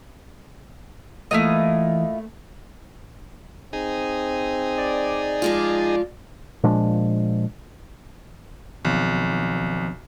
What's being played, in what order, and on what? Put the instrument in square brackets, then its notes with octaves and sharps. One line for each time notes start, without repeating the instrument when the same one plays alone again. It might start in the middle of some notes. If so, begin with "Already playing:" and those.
[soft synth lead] E3 [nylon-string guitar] A3 A#3 [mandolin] E4 F4 D#5
[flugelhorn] C4 [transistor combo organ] D#4 G#4
[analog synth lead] D5
[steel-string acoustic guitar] F3 G#3 F4
[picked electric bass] A#2 F3 G#3 D4
[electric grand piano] B1 [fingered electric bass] D#3 F3 C4